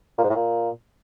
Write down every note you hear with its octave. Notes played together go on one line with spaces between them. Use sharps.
A#2
G#2
A2
A#2